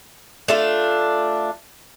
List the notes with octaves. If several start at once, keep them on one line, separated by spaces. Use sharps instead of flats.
A3 D4 F4